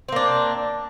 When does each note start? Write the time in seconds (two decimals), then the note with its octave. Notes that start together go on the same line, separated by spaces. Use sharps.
0.08 C4
0.12 A#3
0.16 D4